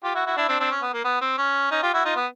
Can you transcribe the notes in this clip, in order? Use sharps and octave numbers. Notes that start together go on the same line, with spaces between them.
F4 G4
E4 F#4
E4 F#4
D4 E4
C4 D4
C4 D4
C#4
B3
A#3
B3
C4
C#4
C#4 D#4
F4 G4
E4 F#4
D#4 F4
B3